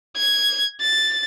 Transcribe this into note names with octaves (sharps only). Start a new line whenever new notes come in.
G#6
A6